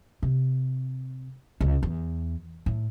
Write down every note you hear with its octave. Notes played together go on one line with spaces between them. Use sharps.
C3
C#2
E2
A2